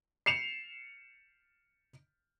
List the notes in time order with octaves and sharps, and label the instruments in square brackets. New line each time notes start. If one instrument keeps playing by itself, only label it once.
[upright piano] C7 C#7 E7 F7